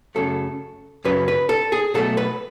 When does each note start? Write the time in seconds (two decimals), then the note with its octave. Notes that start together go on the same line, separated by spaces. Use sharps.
0.15 F#2 C#3 F#3 A3 A4
1.04 F#2 C#3 F#3 B4
1.28 B4
1.49 A4
1.72 G#4
1.94 B2 F#3 A3 A4
2.17 B4